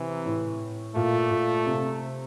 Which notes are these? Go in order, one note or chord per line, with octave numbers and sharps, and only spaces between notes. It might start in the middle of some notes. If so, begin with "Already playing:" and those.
Already playing: C3 E3
A2
A#2 A3
A#2
C3